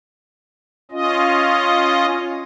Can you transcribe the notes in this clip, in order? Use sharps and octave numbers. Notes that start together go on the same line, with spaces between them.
C#4 F4 D#5